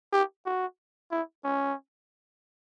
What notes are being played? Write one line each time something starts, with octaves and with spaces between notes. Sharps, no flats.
G4
F#4
E4
C#4